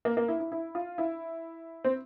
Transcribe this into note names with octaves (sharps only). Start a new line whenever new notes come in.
A#3
A#3
E4
E4
E4
F4
E4
C4